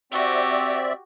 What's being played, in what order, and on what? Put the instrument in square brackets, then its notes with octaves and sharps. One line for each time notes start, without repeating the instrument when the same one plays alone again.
[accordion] C4 D5 E5 [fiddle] F#4 G4